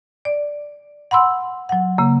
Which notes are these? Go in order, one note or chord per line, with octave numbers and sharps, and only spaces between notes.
D5
F#5 B5 C6 E6
F#3 F#5
C#3 A#3